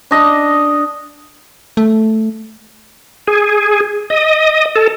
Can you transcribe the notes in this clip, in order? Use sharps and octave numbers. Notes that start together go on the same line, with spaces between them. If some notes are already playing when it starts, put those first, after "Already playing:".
D4 D#5
A3
G#4
D#5
A4